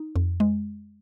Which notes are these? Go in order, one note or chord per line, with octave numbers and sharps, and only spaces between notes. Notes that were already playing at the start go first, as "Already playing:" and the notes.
Already playing: D#4
F2
G#3